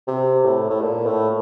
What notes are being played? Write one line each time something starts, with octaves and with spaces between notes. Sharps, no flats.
C3
A2
A2
A#2
A2